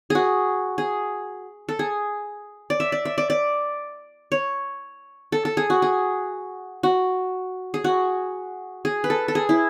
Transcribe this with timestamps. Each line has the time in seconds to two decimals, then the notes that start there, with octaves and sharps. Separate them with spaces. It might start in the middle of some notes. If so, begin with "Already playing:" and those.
0.10 F#4 G#4
0.78 G#4
1.69 A4
1.79 G#4
2.70 D5
2.80 E5
2.92 D5
3.05 E5
3.18 D5
3.30 D5
4.32 C#5
5.32 A4
5.45 A4
5.57 G#4
5.70 F#4
5.82 G#4
6.83 F#4
7.74 G#4
7.84 F#4
8.85 G#4
9.04 B4
9.10 A4
9.28 A4
9.35 G#4
9.49 E4